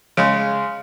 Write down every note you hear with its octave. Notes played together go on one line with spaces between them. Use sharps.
C#3 G#3